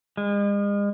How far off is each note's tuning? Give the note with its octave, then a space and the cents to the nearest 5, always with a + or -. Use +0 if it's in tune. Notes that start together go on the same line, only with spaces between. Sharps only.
G#3 -40